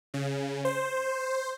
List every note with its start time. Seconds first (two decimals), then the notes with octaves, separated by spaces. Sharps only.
0.14 C#3
0.65 C5